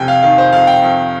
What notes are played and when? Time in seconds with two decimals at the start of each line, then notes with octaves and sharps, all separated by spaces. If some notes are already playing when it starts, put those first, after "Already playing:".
Already playing: F2 C3 G5 G#5
0.08 F5
0.23 D#3 F5
0.38 C5
0.53 F2 F5
0.67 G5
0.82 F2